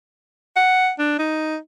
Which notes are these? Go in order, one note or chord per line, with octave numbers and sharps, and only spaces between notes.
F#5
D4
D#4